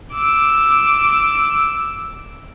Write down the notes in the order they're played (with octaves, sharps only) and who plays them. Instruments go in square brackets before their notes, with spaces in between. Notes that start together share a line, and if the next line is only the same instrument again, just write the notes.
[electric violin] D6 E6